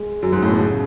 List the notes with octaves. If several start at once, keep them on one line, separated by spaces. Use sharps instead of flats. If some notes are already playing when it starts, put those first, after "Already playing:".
Already playing: G#3
F#2
G#2
A2
B2
C#3